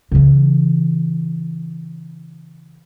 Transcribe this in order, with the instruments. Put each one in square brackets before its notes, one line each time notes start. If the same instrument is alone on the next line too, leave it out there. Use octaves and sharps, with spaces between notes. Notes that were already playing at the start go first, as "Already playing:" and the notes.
[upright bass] C#3 E3